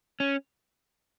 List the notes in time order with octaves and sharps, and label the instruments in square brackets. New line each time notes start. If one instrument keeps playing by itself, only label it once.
[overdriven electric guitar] C#4